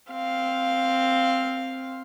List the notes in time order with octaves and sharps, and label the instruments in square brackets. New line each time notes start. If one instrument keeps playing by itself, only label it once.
[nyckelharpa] C4 F5